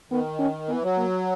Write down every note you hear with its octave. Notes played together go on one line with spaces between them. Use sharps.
D#3 B3
C#4
E3 B3
F#3
A#3